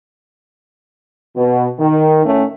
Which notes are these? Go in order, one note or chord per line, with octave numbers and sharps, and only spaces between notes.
B2
D#3
A2 A3 C#4